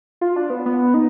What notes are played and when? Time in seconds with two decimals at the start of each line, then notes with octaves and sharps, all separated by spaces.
0.21 F4
0.36 D4
0.50 B3
0.66 B3
0.94 D#4